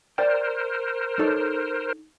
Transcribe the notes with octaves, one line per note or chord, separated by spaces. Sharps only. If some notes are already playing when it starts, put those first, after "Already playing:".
A#4 C5 D5 G5
D#4 A4 C#5